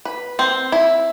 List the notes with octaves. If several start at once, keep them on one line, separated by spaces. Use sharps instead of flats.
B4
C4
E4